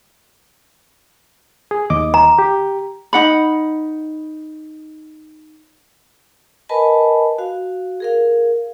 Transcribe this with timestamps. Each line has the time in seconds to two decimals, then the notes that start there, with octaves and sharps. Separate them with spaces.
1.71 G#4
1.90 D#2 D#5 D6
2.14 A#5
2.39 G4
3.13 D#4 F#5 B5
6.69 A#4 B4 D#5 G#5 A5 B5
7.38 F#4 F5
8.00 G#4 A#4 F5